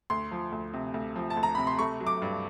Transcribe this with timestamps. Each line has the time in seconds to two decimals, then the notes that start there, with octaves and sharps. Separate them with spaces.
0.10 D2 C6
0.31 F3
0.52 D2
0.73 C3
0.94 D2
1.16 F3
1.30 A5
1.37 D2
1.43 A#5
1.55 C3 B5
1.67 C6
1.79 A3 C#6
2.00 F#3
2.07 D6
2.22 G2